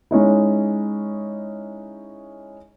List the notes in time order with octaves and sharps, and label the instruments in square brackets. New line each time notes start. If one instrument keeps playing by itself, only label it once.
[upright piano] G#3 C#4 D#4 E4